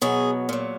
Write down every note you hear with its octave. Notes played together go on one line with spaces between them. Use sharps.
B2 F#3 G#4
A#2 F#3